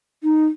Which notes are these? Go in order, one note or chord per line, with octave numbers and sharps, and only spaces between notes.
D#4